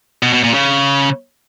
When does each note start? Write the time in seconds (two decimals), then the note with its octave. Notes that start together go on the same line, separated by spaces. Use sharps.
0.23 B2
0.33 B2
0.44 A#2
0.54 C#3